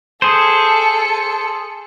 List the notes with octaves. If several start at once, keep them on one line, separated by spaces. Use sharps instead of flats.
G#4 A4 C5 C#7